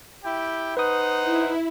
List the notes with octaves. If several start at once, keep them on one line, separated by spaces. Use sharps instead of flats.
E4 G4 G5
D#4 B4 C5 F#5 D#6
E4